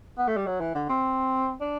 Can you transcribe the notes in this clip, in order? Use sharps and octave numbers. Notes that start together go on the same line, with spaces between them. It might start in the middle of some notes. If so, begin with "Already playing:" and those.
B3
A3
G3
F#3
E3
D3
C4
D4